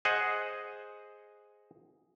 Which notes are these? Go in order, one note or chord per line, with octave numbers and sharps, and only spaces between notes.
G#4 C5 D#5 F#5